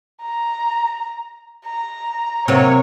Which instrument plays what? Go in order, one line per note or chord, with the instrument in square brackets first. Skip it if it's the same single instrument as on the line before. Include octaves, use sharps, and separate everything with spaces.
[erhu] A#5
A#5
[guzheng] C3 F#3 A#3 [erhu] C#5